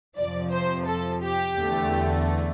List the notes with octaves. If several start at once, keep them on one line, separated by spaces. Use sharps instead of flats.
F2 C3 F3 D5
C5
A4
G4
E2 D3 A3